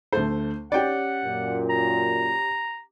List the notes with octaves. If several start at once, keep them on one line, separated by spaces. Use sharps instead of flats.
D2 A3 A4 C5
C#4 G4 D5 F#5 G5
F#2 A#2
A#5